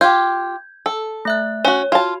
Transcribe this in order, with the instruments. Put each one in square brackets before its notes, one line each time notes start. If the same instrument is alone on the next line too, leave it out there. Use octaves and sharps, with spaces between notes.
[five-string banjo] F4 G4 [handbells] G6 G#6
[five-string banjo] A4
[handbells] A3 E5 F#6
[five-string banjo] C#4 F#4 [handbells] C#5
[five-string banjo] F4 A5 [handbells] F#4